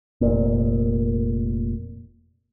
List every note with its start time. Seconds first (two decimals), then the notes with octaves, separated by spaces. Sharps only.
0.21 F1 A#2